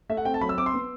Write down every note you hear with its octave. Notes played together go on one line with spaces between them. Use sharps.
A3 E5
F#5
C4 G5
A5
F#3 B5
E6
C4 D6
C6
B3